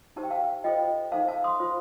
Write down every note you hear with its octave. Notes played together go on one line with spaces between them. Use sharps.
D#4 G4 C5 A5
G5
F5 A5
F4 A4 C5 D#5 G5
D#4 A4 C5 F5 A5
F5 A5
C6 D#6
F4 C5